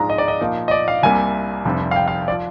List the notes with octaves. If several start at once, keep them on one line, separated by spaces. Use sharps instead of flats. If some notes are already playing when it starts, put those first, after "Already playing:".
Already playing: G#2 F3 G#3 D4 F4 A#5
D#5
D5
D#5
A#2 F3 A#3 D#4
D#5
D5
F5
C2 C3 G3 A#3 G#5
F1 F2 C3 G3 D4
F5
G5
F5
D5
F3